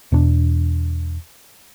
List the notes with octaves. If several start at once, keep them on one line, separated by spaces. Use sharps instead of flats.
E2 B2 D4